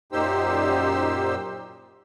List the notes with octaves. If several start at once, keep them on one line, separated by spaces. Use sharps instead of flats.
F#2 A#2 D#4 G4 C5 E6